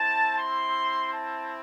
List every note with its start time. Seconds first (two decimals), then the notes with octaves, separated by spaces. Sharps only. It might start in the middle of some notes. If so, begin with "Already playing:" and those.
Already playing: C4 E4 A5
0.38 C6
1.12 A5